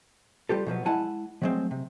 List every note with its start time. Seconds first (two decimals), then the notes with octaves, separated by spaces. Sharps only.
0.49 G3 F4 G4 A4
0.67 B2 F3 F#3 B3
0.86 G#3 E4 F#5 G#5 A5
1.42 F3 F#3 G#3 A3 C4
1.71 C3